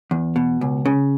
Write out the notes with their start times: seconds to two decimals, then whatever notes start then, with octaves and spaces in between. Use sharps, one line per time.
0.11 E2
0.36 B2
0.61 C#2
0.86 C#3